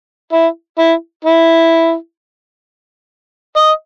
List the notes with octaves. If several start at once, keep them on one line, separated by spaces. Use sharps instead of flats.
E4
E4
E4
D#5